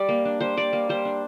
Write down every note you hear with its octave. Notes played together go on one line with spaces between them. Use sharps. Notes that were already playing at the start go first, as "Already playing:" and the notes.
Already playing: G3 D5
A#3
D4
G3 C5
G3 D5
A#3
G3 C5
D4